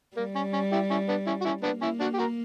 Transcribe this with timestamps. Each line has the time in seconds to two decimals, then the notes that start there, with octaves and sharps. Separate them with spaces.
0.17 G3 A#3
0.35 C#4
0.53 C#4
0.72 E4 G4
0.90 C#4 E4
1.08 B3 D4
1.27 C#4 E4
1.41 F#4
1.45 C#4 E4
1.63 A#3 B3 D4
1.82 C#4 E4
2.00 D4 F#4
2.14 G4
2.18 F#4 A#4